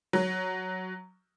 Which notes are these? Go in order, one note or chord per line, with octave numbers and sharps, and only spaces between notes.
F#3